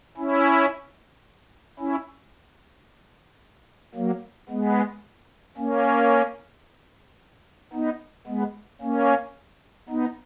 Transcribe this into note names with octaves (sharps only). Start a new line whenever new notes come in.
C#4 E4
C#4 E4
F#3 A#3
G#3 B3
A#3 C#4
B3 D#4
G#3 B3
A#3 C#4
B3 D#4